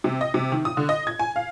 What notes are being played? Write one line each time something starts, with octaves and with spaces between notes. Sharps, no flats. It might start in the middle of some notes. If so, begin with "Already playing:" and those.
C3
D#5
C3
D#3
D#6
D3
D#5
G#6
G#5
F5